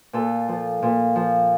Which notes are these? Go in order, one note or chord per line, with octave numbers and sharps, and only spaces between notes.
A#2 A4
F3
A#2
F3